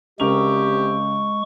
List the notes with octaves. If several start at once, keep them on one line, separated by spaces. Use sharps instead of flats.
D2 C#3 G#3 C4 G4 A#4 C#6 F7